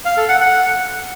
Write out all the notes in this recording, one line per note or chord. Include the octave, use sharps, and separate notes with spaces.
F5
A4
F#5
F#5